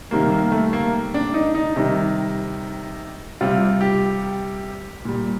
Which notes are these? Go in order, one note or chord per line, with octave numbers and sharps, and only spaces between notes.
C3 D#3 G3 A#3
A#3
A3
A#3
D4
D#4
D#4
C3 D#3 G3
C3 G3 F4
G4
A#2 G3